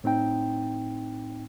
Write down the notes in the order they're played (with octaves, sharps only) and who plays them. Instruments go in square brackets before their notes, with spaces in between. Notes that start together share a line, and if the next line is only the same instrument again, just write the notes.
[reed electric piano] A2 C4 D#4 G5